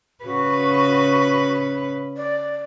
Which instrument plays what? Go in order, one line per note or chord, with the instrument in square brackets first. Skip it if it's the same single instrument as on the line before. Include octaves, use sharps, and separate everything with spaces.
[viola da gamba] C#3 B4 [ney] F#4
[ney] D5